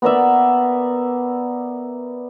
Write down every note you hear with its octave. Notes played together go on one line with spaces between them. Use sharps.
B3 A#4 D5 E5